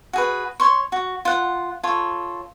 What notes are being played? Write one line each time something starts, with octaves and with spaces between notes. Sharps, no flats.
F#4 G#4 B4
C#5 C6 C#6
F#4
F4 F#5
F4 A4 C#5